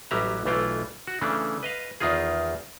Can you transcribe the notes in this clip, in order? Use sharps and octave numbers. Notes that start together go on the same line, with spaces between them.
A1 F#3 G3 G4 E5 A#5
B1 E3 A3 E4 F4 G5
F#4
C#3 E3 A3 C#4 D4
B4 D#5 F5
E2 D#3 D#4 F4 G#4